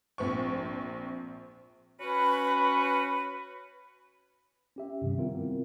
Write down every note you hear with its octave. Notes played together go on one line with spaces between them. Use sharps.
A#1 C4 C#6
C#4 F#4 B4
C#4 G4 E5
G2 C3 D#3 F3 G3
G3 B3 C4 E4 F4 A#4